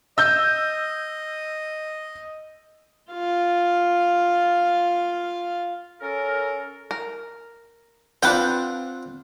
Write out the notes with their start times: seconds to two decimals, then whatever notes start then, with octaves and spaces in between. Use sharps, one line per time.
0.18 D#5 E6 G6
3.12 F4 F5
6.00 C#4 A4 A#4
6.91 A#4
8.23 C4 D4 F4 B4 F#5 G5